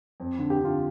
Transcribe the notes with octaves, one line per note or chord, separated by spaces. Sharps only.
F2
D3
G4
D3 F4